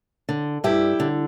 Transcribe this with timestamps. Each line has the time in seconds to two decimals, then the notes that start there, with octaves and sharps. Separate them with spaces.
0.29 D3
0.64 G2 E4 G4
1.00 D3